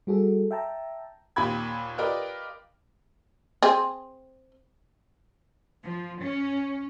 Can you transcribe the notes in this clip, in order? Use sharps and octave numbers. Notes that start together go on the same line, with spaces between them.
G3 F#4 G#4 A4
E5 G5 A5 A#5
D#2 A#2 G4 B5 G#6
F4 G4 A#4 B4 D5 D#5
C4 G#4
F3
C#4